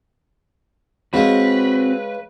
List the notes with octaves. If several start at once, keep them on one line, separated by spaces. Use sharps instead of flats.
C#3 G#3 C4 F#4 B4